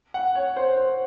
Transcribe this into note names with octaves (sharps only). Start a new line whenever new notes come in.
F#5
C#5
C5
C5